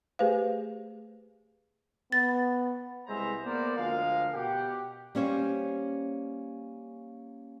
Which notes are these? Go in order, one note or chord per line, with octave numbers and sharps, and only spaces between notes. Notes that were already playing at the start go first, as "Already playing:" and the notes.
A3 G4 G#4 B4 C5 F5
B3 A6
C2 G#3 B3 C5 E5 A#5
A#3 B3 A#4 C5 D5 F#5
D2 F3 G#3 A#4 F5
B2 G4 F#5
G3 A#3 C#4 G4 C5 C#5